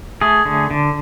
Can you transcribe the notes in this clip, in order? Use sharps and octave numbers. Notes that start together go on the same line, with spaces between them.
A3 G#4
D3
D3